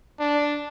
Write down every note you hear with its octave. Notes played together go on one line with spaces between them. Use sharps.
D4